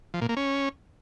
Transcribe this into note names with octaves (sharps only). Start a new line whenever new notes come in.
F3
A#2
A#3
C#4